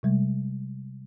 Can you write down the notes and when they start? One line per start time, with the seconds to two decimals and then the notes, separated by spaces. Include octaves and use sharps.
0.03 C3 G3 G#3